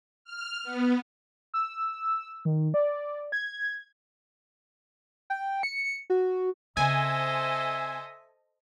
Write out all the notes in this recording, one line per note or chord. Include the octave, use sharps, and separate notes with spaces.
F6
B3
E6
D#3
D5
G#6
G5
C#7
F#4
C#3 C4 A4 C5 D#5 E5 G#5